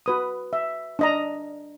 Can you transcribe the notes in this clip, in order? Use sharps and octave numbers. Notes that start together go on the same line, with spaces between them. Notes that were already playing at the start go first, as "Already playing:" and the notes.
F#4 B4 D#6
E5
D4 D#5 A#5